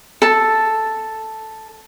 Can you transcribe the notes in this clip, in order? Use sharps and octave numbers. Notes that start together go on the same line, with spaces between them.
A4 A5